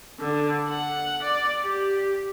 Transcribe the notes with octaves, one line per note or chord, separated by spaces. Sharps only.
D3
F#5
D5
G4